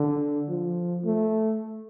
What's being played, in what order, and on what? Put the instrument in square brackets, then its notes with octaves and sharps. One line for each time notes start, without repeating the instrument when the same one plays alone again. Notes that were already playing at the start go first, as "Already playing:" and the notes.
Already playing: [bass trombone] D3
F3
A3